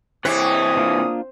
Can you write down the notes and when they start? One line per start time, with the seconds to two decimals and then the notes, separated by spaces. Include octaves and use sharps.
0.25 C3 E3 C4 B4 C#5 D6 D#6
0.77 A#3 D4 F4